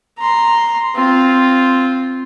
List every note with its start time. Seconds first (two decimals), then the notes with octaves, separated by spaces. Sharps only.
0.18 A#5 C6
0.96 C4 F4